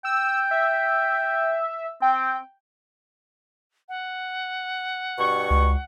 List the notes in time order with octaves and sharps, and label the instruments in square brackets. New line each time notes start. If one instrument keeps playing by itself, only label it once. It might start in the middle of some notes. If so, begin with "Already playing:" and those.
[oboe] G5 [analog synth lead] E6
[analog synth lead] E5
[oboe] C4 [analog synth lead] G5
[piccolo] F#5
[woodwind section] G2 B2 C#6
[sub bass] C#2